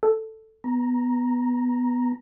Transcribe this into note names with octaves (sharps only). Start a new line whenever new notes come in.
A4
B3 A#5